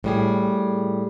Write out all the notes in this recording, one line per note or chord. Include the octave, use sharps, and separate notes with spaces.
A2 G3 G#4